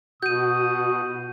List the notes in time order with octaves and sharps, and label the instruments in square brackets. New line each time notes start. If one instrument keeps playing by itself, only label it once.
[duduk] B2 [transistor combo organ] F#4 [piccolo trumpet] D#6 [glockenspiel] G6 D#7